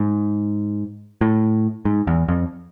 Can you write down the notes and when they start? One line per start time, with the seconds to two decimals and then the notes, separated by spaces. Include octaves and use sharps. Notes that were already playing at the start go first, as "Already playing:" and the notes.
Already playing: G#2
1.21 A2
1.85 G#2
2.07 E2
2.28 F2